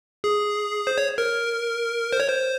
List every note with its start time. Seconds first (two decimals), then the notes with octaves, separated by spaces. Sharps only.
0.24 G#4
0.87 C5
0.98 C#5
1.18 A#4
2.13 C5
2.20 C#5
2.28 C5